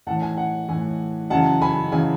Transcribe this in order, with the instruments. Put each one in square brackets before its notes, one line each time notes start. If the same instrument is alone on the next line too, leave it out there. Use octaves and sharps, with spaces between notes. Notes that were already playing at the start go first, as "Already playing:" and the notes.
[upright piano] A2 F#5 A5
E3
G#5
F#5
A2 E3 G#5
F#2 C#3 E3 F#5 A5
G#5 B5
C#3 E3 G#5